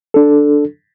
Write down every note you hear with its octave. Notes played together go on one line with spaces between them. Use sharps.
D4 A4